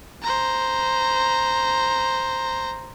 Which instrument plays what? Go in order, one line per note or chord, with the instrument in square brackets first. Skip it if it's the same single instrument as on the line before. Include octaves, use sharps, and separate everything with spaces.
[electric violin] C5 A#5